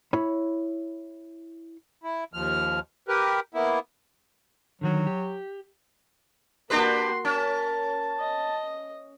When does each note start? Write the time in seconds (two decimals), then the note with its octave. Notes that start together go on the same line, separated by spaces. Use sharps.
0.13 E4 C#5 B5
2.04 E4
2.34 D#2 F3 F6
3.08 G4 A#4 B4
3.54 A#3 B3 E4
4.81 D3 D#3 F#3 F#4
5.07 G4
6.70 A#3 D4 F#4 G4 B4 C6
7.25 C#4 A#4 A5
8.20 D#5